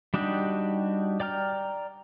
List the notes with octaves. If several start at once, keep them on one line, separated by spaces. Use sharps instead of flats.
G3 D4 D#4 F#4 G4
D5 G5 A#5 F6